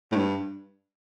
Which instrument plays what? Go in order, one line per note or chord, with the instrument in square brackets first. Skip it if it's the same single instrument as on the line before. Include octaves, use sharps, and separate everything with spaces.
[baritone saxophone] A2
G2